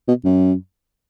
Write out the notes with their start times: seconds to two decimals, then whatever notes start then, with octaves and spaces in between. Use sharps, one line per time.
0.08 B2
0.25 F#2